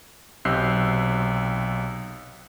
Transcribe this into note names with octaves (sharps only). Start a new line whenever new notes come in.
B1 C3 E6 F#6 G6 C7